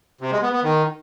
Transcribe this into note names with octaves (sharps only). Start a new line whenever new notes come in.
C3
G#3
B3
B3
D#3